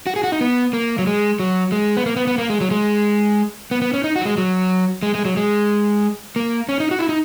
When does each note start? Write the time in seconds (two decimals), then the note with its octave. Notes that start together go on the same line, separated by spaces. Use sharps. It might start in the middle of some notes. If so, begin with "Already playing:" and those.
0.07 F#4
0.16 G#4
0.24 F#4
0.32 D#4
0.41 B3
0.73 A#3
0.99 F#3
1.07 G#3
1.40 F#3
1.72 G#3
1.97 B3
2.06 A#3
2.16 B3
2.27 B3
2.38 A#3
2.50 G#3
2.61 F#3
2.71 G#3
3.71 B3
3.82 B3
3.93 C#4
4.04 D#4
4.16 F#4
4.21 F#3
4.25 G#3
4.38 F#3
5.03 G#3
5.15 G#3
5.25 F#3
5.37 G#3
6.36 A#3
6.69 C#4
6.80 D#4
6.91 F#4
6.99 E4
7.09 D#4